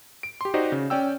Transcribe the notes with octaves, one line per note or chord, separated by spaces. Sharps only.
D7
G4 C6
D#4 F#4 G4 C5 D5 D#5
C#3
C#4 D5 G5 E6